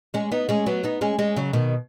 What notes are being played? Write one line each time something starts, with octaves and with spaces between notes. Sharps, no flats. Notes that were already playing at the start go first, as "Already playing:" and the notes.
G#3 C#4
B3 D#4
G#3 C#4
F#3 B3
B3 D#4
G#3 C#4
G#3 C#4
C#3 F#3
B2 D#3